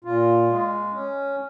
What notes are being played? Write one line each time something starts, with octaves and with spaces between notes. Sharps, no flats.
A#2 F4
G#3
C#4